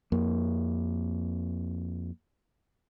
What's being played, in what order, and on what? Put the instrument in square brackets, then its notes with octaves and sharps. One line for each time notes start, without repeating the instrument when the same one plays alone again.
[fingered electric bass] F2 A#3